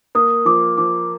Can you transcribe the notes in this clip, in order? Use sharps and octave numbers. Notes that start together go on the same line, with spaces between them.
A#3 D#6
F3 D6
F3 D6